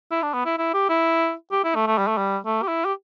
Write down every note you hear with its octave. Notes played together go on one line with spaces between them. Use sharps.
E4
D4
B3
E4
E4
G4
E4
G4
E4
A3
A3
G3
A3
G3
A3
G4
E4
G4